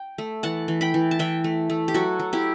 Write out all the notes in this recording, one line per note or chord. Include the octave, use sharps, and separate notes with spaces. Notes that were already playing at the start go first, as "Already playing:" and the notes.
Already playing: G5
A3
E3 F#5 A5
E3
G5 B5
E3
A5
E3 E5 G5
A3
A3
G4
F#3 F#4 A4
F#3
E4 G4